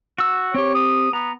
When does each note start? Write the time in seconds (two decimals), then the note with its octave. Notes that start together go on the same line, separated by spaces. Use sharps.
0.18 F#4 E6
0.54 C4 G4 C#5
0.74 D#6
1.13 B3 A#5